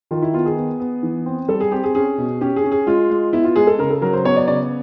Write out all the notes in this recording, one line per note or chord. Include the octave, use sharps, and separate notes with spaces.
D#3 F4
E4
B3 F4
G#4
B3
B3
E3
C4
G3 A4
G#4
C4 G4
G#4
C#4 G#4
B2
C#4 G4
G#4
C#4
G#4
G#3 F4
G#3
B3 E4
F4
G#3 G#4
A4
C#3 A#4
A4
F#3 A#4
C5
B3 C#5
D5
C#3 D5